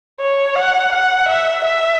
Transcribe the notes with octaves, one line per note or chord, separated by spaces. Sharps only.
C#5
F#5
F#5
E5
E5